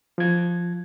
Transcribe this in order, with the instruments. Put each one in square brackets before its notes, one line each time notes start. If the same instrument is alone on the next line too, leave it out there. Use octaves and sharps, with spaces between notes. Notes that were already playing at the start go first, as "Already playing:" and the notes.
[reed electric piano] F3 G#6